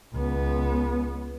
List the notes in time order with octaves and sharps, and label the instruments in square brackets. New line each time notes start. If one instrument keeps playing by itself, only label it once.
[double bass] C#2 B3